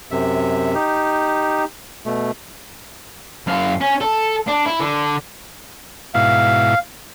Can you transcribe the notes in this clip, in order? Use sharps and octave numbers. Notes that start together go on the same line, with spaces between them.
F#2 C3 E5
D#4 G4
B2 A3
F#2 F5
C#4
A4
D4
E4
D3
G#2 B2 E4 F5